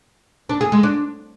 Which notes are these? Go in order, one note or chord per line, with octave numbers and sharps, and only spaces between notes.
D4
G#4
G#3
D4